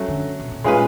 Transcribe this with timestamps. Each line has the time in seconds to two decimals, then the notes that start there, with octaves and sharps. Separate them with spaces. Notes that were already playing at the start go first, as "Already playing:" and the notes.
Already playing: F#3 A3 C#4
0.08 D3
0.39 B2
0.51 A#2
0.64 A#2 G#3 C#4 F4 G#4 B4